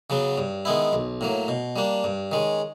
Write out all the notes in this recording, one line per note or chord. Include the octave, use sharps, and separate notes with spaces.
C#3 F#3 B3
G2
D#3 G#3 B3 E4
B1
A2 F#3 A#3
B2
G3 A#3 D4
G2
D#3 G#3 C#4